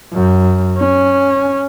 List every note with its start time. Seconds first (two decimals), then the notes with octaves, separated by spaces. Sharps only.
0.12 F#2
0.78 C#4